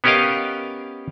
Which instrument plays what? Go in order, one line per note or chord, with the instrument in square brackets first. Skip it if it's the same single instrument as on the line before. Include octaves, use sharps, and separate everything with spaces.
[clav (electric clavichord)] B3 C#4 G4 A#4 D#5 F5